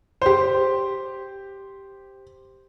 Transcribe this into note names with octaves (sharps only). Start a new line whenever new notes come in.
G4 C5